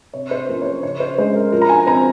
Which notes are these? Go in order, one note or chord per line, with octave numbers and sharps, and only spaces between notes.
C3 C#5
C5
F3 A#3 C#4 A#4
C#5
C5
C#3 C#5
C5
G#3 C#4 C5
A#4
F3 A#4
A#5
G#5
C4 A#5